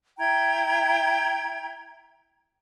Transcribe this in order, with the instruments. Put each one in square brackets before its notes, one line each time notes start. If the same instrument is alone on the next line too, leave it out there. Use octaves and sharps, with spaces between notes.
[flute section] E4 G5 A#5 G#6